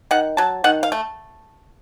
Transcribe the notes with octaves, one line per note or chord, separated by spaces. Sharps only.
D#3 F#5
F#3 A5
D#3 F#5
F5
A3